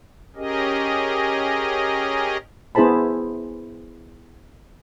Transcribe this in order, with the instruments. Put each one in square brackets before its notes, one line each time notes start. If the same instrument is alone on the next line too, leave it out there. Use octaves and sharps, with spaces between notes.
[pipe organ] C#4 G4 G#4 A#4 D#5
[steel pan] B3 E4 G#4 C5 A5 B5